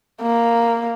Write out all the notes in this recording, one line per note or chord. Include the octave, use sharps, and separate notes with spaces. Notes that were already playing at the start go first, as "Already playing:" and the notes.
A#3